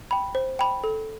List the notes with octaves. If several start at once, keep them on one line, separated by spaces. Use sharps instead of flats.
G5 B5
C5
G5 B5
A4